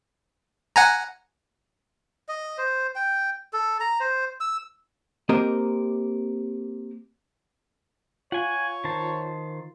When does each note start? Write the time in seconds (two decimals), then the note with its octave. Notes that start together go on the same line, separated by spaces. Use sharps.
0.76 F#5 G#5 A#5
2.28 D#5
2.58 C5
2.95 G5
3.53 A4
3.81 A#5
4.00 C5
4.40 E6
5.29 A#3 C4 G4 A#4 C5 D#5
8.32 F4 C#5 F#5 G#5
8.84 D#3 C5 A5